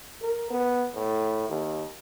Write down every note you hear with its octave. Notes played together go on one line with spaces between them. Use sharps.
A#4
B3
A2
D#2